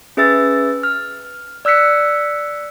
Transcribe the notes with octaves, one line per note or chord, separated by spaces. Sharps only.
C#4 G#4 B4 E5 E6 A6
F6
D5 E6 F#6 B6 C#7